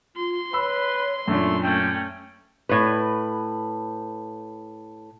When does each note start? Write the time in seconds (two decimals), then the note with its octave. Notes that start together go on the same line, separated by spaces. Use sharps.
0.16 F4 C6
0.53 B4 C#5 B5 E6
1.28 F#2 A#2 A3 D4
1.63 A3 C#4 G5
2.69 A2 B4